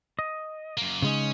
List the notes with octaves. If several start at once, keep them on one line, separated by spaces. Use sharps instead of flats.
D#5
F#2 A#3
C#3 G#3 C#4 D#4